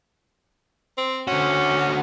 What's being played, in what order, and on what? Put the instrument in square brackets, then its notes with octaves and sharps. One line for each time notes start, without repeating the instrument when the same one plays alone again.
[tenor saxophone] C4
[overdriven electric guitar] D3 F#4 [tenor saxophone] C#4